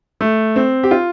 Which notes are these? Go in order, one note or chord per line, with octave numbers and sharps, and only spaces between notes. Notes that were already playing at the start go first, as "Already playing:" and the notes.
A3
C4
G4
F4